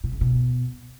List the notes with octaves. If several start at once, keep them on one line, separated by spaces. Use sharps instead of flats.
B2
C#3
B2